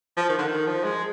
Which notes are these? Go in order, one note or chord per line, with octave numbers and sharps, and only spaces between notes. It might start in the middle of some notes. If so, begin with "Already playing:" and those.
F3
D#3
D3
D#3
F3
G#3